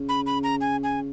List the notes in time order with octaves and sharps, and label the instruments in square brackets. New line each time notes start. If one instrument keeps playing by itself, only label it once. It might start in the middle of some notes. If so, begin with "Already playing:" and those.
Already playing: [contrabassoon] C#3
[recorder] B5
B5
A#5
G#5
G#5